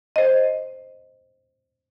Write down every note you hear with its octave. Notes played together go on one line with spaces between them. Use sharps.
C5 D#5